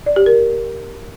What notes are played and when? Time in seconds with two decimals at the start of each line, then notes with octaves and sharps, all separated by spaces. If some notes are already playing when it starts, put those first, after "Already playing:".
0.06 D5
0.16 G4
0.26 A#4